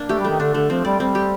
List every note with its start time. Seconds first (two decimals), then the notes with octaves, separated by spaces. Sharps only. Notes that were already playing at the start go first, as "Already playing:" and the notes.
Already playing: A#3 D4
0.09 A3 G4
0.19 G3
0.24 D#3 A3
0.39 D3 D4
0.54 D3 A3
0.70 F3 C4
0.85 G3 D5
1.00 G3 C4
1.15 G4